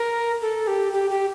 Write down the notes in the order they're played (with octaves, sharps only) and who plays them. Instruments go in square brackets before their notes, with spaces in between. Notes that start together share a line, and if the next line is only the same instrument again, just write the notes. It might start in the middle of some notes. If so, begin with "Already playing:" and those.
Already playing: [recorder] A#4
A4
G4
G4
G4